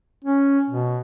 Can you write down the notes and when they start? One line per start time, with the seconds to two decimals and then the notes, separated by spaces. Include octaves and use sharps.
0.25 C#4
0.70 B2